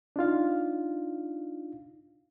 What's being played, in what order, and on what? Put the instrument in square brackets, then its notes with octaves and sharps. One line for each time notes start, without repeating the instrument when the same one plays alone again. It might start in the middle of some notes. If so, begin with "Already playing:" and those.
[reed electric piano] D4 D#4 F4 F5